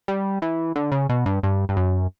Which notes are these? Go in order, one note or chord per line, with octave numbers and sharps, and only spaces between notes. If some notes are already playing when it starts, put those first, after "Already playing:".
G3
E3
D3
C#3
B2
G2
G2
G2
F#2